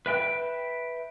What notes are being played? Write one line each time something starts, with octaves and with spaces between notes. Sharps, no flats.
B4 E5 G5